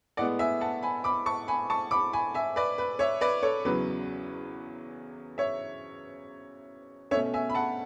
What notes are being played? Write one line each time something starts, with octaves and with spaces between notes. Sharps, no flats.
A2 G#3 B3 D5 F#5
E5 G#5
F#5 A5
G#5 B5
B5 D6
A5 C#6
G#5 B5
A5 C#6
B5 D6
G#5 B5
E5 G#5
B4 D5
B4
C#5 E5
B4 D5
A4 C#5
E2 C#3 F#3 B4
C#5 E5
B2 A3 C#4 C#5 E5
E5 G#5
B5
F#5 A5